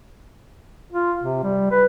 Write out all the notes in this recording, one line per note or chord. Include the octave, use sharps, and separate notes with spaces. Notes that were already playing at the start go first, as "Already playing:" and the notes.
F4
C3
G3
B4